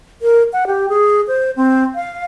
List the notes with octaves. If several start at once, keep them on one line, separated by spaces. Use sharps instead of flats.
A#4
F#5
G4
G#4
C5
C4
F5